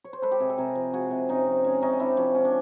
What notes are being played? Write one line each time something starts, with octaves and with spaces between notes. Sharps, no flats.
C#5
C5
G#3 A4 B4
G4
C3 G#4
A4
C3 G#4 A#4
F3
G#3 F#4 G#4
C3
C3 C#4 D#4
F3
G#3 C#4
C3 C#4 D#4
C3 D4 E4
F3 C#4
G#3 C#4
D4